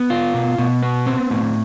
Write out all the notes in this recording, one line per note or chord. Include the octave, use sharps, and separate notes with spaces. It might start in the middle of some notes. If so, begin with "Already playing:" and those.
Already playing: B3
F4
B2
B2
B3
C4
A2